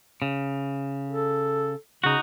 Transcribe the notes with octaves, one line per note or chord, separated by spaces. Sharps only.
C#3
A4
C#3 D#4 F#4